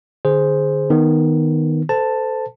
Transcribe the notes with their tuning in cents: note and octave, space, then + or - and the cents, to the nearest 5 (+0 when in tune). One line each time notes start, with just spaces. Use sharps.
D3 +15 G#4 +0 C5 +0
D#3 +0 B3 +0
A4 +0 C5 -30 A5 +5